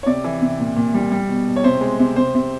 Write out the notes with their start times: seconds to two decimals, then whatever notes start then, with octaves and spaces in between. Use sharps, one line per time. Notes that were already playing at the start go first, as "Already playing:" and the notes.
0.03 C#5
0.06 C3 D5
0.24 E3
0.42 C3
0.60 A#2
0.77 A#2
0.94 G3
1.12 G3
1.29 B2
1.47 B2
1.56 C#5
1.64 C3 C5
1.81 G#3
1.99 C3
2.16 C3 C5
2.35 C3